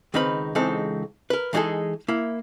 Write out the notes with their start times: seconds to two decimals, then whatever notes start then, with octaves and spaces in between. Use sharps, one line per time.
0.14 C#2 D#3 C4 D#4 B4 B5
0.55 C#2 E3 G#3 C4 D#4 A4
1.30 A#4 B4
1.53 E3 G#3 D#4 F4 G#4 A4
2.08 A#3 E4